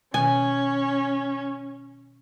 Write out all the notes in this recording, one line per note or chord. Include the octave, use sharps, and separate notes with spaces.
B2 D#3 C#4 G#5